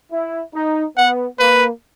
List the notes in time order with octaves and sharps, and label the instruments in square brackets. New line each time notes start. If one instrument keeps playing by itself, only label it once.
[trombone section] E4
D#4
[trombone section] B3 [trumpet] F#5
[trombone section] A#3 [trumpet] B4